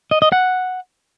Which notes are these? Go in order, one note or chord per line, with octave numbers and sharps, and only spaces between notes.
D#5
D#5
F#5